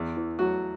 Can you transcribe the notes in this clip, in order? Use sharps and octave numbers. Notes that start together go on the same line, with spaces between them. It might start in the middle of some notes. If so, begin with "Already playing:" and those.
Already playing: E2
E3
F#3 A3 F#4